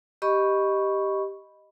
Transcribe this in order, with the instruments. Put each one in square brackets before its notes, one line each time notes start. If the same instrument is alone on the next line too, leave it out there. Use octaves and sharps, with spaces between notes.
[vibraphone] G4 D#5 B5 C#6